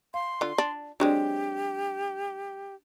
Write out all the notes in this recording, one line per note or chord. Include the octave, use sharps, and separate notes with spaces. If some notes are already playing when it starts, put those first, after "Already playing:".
F5 C6
D3 F4
D4
F#3 G#3 C4 D4 G4 D5